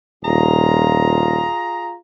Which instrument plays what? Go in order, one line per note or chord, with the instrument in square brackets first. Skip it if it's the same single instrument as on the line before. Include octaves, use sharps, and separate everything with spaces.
[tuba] D#1 [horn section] F4 G#4 A#5